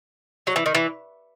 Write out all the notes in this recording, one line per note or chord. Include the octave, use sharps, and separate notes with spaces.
F#3
E3
D#3
E3